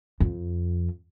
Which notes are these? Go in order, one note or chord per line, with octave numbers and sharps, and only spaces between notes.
F2